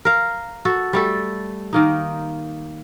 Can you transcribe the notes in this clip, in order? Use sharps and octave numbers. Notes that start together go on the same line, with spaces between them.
A#4 F5
F#4 A4
G3 A3 A4
D#3 A#3 D#4